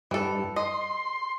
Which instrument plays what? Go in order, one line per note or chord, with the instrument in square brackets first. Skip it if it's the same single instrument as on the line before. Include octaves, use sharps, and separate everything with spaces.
[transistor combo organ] G2 [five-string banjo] E3 A4
[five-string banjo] D#5 [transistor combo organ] C6